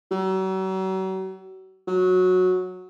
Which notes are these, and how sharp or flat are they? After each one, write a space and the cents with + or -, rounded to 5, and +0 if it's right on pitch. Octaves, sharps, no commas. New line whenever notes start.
F#3 +40
F#3 -10